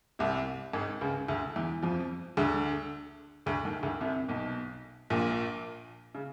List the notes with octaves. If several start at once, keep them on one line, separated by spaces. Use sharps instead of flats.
C2 C3
G#1 G#2
C#2 C#3
D2 D3
E2 E3
F2 F3
D2 D3
D2 D3
D#2 D#3
D2 D3
C2 C3
B1 B2
A#1 A#2
C#3